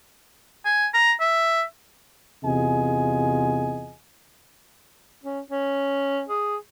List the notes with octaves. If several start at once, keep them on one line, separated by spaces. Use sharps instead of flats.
G#5
A#5
E5
E2 C3 F4 G#4 D#5 G#5
C#4
C#4
G#4